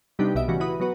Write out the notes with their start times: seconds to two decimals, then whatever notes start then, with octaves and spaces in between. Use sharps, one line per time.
0.19 C3 G3 B3 D4 D#4 G4
0.35 B1 B2 D#5 E5 D7
0.48 A2 C#3 E3 G3 F#4
0.60 E4 F#4 B4 D#6
0.80 F#3 B3 F#4 B4